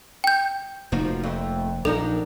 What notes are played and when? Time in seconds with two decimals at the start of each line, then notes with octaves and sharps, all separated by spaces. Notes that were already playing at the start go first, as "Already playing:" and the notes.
0.24 G5 G6
0.92 F1 F3 A#3 D#4 F#4
1.23 F2 A3
1.85 A#1 D4 D#4 A4 A#4